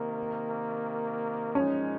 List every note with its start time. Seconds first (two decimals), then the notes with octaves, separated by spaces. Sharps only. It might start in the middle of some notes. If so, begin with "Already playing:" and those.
Already playing: C3 D#3 A#3
1.55 A#2 F3 G#3 C#4 D#4